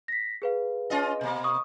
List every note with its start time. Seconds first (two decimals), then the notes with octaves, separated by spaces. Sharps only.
0.08 A#6 B6
0.42 G#4 B4 F5
0.90 C#4 F4 D#5
1.21 B2 A#3
1.44 C#6 D#6